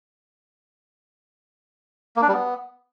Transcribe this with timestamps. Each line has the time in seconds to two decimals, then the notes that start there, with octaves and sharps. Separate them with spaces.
2.16 A#3
2.22 D4
2.28 G3
2.34 B3